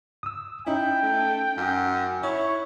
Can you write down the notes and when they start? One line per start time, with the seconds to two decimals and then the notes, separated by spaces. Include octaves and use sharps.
0.23 D#6 E6
0.67 C#4 D#4 E4 G5
1.03 A3
1.57 F#2
2.23 E4 C#5